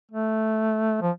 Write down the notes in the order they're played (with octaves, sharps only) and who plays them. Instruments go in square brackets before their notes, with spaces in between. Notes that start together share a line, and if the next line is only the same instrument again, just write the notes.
[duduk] A3
F3